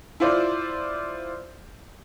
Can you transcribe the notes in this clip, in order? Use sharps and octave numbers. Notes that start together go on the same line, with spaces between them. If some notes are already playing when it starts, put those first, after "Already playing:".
E4 F4 C5 D5